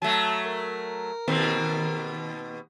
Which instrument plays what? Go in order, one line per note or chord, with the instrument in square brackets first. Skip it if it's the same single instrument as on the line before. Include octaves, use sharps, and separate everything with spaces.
[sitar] F#3 A3 [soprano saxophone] A5
[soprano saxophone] A#4
[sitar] D#2 B2 C4